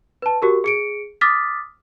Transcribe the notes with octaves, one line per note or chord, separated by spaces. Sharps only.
B4 A5
F#4 G4 A#4
G#4 C#7 D7
D6 D#6 F6 A6 B6